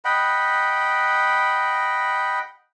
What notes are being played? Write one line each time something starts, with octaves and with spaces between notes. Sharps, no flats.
D#5 F#5 G5 B5